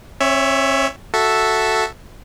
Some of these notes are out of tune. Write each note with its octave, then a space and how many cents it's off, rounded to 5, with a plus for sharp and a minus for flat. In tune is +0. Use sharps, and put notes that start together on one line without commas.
C#4 -45 C#5 +15 E5 +0
F#4 +0 A4 +0 E5 +0